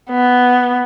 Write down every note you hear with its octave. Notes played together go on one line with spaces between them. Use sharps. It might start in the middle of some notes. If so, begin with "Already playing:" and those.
B3